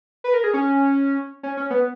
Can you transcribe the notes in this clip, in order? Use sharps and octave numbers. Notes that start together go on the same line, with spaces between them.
B4
A#4
G#4
C#4
C#4
C#4
B3